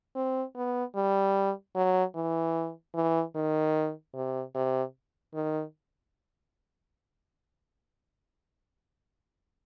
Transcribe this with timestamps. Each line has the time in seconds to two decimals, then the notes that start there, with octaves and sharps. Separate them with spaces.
0.15 C4
0.56 B3
0.95 G3
1.76 F#3
2.15 E3
2.95 E3
3.35 D#3
4.14 C3
4.55 C3
5.34 D#3